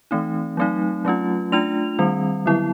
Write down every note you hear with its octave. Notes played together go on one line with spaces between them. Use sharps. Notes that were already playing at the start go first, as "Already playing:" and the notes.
E3 A3 C4 D#4
F#3 A3 C4 D#4
F#3 A3 C#4 F4
A3 D4 F4 F7
D#3 G3 C4
D3 F#3 B3 E4